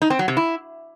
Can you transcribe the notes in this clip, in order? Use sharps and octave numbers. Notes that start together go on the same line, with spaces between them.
D#4
C4
F#3
C3
E4